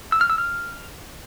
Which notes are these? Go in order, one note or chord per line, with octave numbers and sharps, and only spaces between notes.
E6
F6
E6
F6